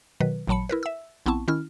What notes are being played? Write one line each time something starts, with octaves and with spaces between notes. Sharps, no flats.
B2 D#3 F#3 B4
A1 A#2 F#3 A5 B5 C#7
E4 A#4 B4
E5 E6
A#1 B3 C4 E4 A5 C#6
D#3 C#4 E4 F6